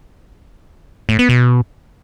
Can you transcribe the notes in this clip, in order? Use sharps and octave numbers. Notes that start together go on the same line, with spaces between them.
A2
B3
B2